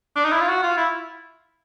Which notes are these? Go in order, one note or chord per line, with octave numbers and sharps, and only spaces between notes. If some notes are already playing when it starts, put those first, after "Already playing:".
D4
D#4
E4
F4
F#4
F4
E4